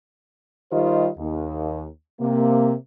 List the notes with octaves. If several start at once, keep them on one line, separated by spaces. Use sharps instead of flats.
D#3 G3 F4 G4 C5 D#5
D#2
C3 A#3